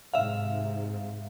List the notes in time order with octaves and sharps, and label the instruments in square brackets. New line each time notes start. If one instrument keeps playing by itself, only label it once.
[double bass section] G#2 C3 [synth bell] E5 F5